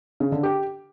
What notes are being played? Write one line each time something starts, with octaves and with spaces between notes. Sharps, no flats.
C#3
D3
G4